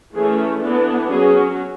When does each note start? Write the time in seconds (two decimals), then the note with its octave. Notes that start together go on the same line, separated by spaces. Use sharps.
0.15 E3 A3 C#4 G#4
0.62 E3 B3 D4 A4
1.11 F#3 C#4 G#4